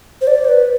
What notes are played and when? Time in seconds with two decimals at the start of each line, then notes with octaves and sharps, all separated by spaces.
0.21 C5
0.27 D5
0.45 C5
0.49 B4